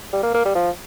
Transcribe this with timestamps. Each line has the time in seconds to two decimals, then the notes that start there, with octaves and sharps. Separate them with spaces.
0.13 G3
0.23 A#3
0.34 A#3
0.45 G3
0.55 F3